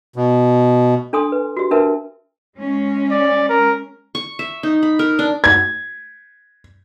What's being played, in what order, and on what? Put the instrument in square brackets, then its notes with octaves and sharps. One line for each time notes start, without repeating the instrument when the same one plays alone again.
[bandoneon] B2
[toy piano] D4 A4 G#5 C6 D#6
B4
F#4 G4
D4 A#4 B4 E5 A5
[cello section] G#3 C#4
[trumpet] D5
A#4
[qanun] C#6
E5
D#4
B5
A#4
D4
[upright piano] G#6